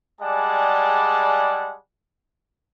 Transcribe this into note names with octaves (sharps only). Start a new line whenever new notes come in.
G3 G#3 G#4 D5 F#5 A5